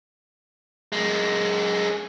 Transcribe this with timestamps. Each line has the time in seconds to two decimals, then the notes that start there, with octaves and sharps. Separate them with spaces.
0.92 F#2 G#3